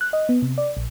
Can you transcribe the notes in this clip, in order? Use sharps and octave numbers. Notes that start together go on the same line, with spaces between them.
F#6
D#5
B3
C3
D5
A#1